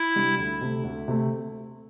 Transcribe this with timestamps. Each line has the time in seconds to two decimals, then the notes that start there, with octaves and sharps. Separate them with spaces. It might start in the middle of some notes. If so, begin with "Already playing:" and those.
Already playing: E4
0.16 C3 G3 D4
0.38 D2
0.61 C3 A3
0.84 D2
1.08 C3 A3